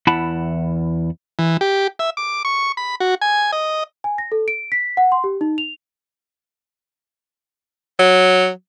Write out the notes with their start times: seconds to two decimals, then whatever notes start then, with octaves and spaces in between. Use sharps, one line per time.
0.07 E2 E4 F#5 A5 B5
1.39 E3
1.61 G4
1.99 E5
2.17 D6
2.45 C#6
2.77 B5
3.00 F#4
3.22 G#5
3.52 D#5
4.04 G#5
4.18 A#6
4.32 A4
4.48 D7
4.72 B6
4.97 F#5
5.12 C6
5.24 G4
5.41 D#4
5.58 F7
7.99 F#3